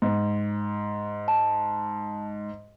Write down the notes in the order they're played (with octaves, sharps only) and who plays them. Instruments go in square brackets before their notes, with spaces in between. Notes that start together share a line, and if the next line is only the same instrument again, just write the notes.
[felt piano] G#2
[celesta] A5